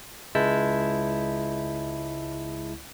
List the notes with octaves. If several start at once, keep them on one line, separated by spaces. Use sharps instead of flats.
C#2 G#3 E4 A5 G6 B6